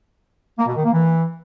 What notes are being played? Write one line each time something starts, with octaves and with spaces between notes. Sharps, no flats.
A#3
B2
D#3
A#3
E3